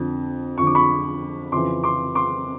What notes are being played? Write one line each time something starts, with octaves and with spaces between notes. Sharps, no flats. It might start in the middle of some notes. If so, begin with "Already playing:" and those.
Already playing: F2 D3
F2 D3 C#6
D6
B5 C#6
F2 C#3 E3 C6 D6
C6 D6
C6 D6